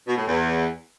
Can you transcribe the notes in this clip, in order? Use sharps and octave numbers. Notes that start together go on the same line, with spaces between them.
B2
A2
E2